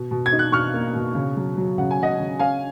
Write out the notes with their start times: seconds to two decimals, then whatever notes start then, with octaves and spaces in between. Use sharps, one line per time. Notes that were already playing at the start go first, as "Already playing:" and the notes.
Already playing: B2
0.11 B2
0.26 G#6
0.33 D#4
0.39 F#6
0.52 B2 C#6 F6
0.74 A#3
0.95 B2
1.15 C#3
1.36 F#3
1.57 F#3
1.78 C#3 F#5
1.91 G#5
1.98 C#3 D#5 F#5
2.20 C#3
2.39 C#4 F5 G#5